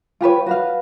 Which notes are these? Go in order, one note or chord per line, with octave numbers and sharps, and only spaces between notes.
F4 G4 B4 C#5
F#4 B4 F5